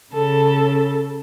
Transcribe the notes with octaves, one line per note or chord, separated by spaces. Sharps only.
C#3 A4